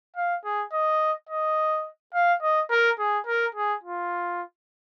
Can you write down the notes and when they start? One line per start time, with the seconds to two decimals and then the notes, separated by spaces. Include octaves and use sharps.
0.16 F5
0.45 G#4
0.73 D#5
1.29 D#5
2.14 F5
2.43 D#5
2.71 A#4
2.99 G#4
3.27 A#4
3.55 G#4
3.83 F4